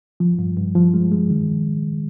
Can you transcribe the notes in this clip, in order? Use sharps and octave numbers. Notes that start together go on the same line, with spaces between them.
F3
G2
G2
F3
G#3
G#3
D#3